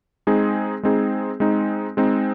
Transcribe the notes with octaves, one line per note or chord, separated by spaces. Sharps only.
G#3 C4 D#4 G#4
G#3 C4 D#4 G#4
G#3 C4 D#4
G#3 C4 D#4